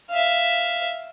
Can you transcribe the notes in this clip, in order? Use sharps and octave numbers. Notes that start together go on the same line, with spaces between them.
E5 F5